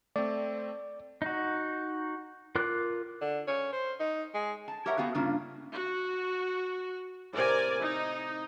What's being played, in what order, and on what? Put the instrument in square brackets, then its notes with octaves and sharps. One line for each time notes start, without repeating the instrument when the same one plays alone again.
[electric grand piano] A3 C4 [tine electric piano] D5
[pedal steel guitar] D#4 F#4
F4 A#4 D6 F#6
[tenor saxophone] D3
C#4
C5
D#4
G#3
[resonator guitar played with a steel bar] A5
G4 A#4 C#5 E5 F#5
B3 F#4 G4 F5
G2 C#3 A#3 D4 F4
[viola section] F#4
[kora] A2 C3 [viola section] A#4 D5 G#5
[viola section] D#4 [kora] E4